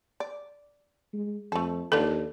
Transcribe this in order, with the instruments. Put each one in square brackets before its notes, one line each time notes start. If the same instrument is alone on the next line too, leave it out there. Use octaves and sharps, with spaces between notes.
[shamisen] D5
[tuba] G#3
[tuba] F2 [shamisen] A3 A4
[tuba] D#2 [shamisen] D4 F4 B4 [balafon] A4